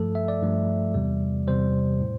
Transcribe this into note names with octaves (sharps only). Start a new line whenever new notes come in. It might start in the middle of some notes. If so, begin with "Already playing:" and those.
Already playing: G2 F3 A3 A4
E5
D5
G2 F3 A3
E2 C3 G3
E2 C3 G3 C5
A2